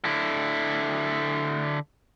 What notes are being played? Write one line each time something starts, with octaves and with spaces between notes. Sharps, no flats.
D3 E4